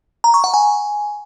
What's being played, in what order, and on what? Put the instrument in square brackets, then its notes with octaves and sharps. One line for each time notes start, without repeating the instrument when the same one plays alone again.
[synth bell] A#5
C#6
F#5
G#5